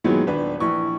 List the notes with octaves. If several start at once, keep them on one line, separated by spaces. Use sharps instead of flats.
A#2 D#3 E3 F#3 G#3 B3
D#1 D4 B4
A#1 E3 C#6